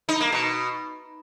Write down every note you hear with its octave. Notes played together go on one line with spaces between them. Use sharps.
D#4
A#3
B2